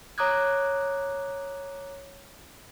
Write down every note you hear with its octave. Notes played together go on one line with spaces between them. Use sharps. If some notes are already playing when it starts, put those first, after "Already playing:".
C#5 A#5 D6 D#6 F#6 G#6